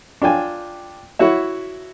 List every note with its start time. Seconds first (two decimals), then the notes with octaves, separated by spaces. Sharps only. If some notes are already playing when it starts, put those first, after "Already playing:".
0.22 D4 F4 G5 G#5
1.19 E4 F#4 C#5 E5